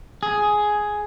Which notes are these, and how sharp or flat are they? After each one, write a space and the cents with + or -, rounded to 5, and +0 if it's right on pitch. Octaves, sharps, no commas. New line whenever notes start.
G#4 +5